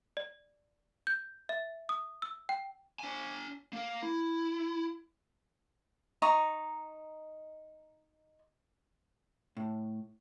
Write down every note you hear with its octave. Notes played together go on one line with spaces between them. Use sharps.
D5
G6
E5
D#6
E6
G5
D4 G#5
A#3 A#4
E4
D#4 A#5 C#6
A2